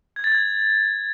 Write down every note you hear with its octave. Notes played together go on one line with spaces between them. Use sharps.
G#6
A6
G#6